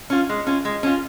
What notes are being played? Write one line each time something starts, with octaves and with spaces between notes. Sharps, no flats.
C#4 F4
G#3
C#4 F4
G#3
C#4 F4